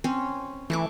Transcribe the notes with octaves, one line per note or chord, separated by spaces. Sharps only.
C4 C#4 C#5
E3 A3 C#6 D6